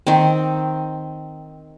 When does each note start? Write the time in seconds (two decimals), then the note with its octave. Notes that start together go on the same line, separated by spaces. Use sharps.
0.07 D#3 C4